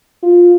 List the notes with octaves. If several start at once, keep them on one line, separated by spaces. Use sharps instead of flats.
F4